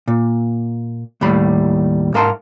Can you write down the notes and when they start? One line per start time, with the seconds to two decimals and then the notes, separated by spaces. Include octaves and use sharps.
0.08 A#2
1.21 D#2 A2 G3 B5
2.14 G#2 A#4 F5 A5 C6